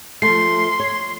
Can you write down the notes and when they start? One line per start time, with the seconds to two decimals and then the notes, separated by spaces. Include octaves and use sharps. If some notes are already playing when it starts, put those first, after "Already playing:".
0.22 F3 A3 C6 C7
0.80 C#5